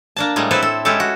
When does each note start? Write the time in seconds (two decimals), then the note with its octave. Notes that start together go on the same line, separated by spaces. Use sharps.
0.16 A#3 D4 A5
0.36 A2 G3 G#3 A#3
0.51 C4 E4 A4 B4 C5
0.62 A4
0.85 G#3 C#4 E4 G4 A4
1.00 F#4